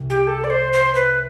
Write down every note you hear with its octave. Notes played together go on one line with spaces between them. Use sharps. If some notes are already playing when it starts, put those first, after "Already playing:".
Already playing: C2
G4
A4
D5
C5
C5
B4